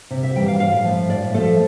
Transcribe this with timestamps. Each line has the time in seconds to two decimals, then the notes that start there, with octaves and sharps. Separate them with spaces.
0.11 C3
0.23 E5
0.36 E3 G3 G5
0.48 F5
0.60 A2 F5
0.85 F3 A3
1.09 A2 D5
1.34 F3 A3 A4